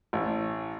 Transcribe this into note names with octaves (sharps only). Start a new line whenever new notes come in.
A1